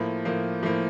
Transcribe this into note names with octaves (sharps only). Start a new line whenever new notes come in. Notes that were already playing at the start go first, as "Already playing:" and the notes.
Already playing: A2 F3 A#3
A2 F3 A#3
A2 F3 A#3